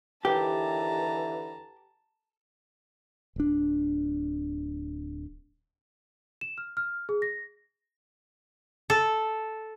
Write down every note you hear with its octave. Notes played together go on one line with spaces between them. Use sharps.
D#2 D3 E3 G4 A5 A#5
D1 D4
E7
F6
F6
G#4
A#6
A4